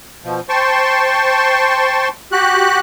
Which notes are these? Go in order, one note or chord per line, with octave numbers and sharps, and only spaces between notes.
B2 F3
C5 G5 A5 C6 C#6
F#4 G4 F#6